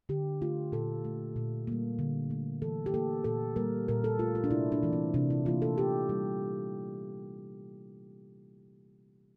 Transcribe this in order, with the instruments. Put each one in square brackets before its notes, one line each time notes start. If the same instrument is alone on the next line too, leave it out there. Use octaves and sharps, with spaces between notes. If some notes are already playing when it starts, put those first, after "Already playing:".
[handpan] D3 G4
A3 F4
A#2 A4
A3
A#2
G3 A#3
D3
A3
E3 A4
G4
A#3 A4
A#2 A4
G3 A#3 A#4
A#2 A#4
A4
A3 F4
F4
D4
C3 E4
D4
E3 A3
C4
C3 D4
E4
E3 A#3 F4
A4
C3 G4
G3